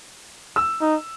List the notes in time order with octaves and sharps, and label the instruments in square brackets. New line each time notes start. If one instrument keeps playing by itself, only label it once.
[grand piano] E6
[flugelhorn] D#4